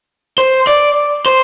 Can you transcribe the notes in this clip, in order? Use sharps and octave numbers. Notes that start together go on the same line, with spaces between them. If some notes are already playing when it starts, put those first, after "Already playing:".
C5
D5
C5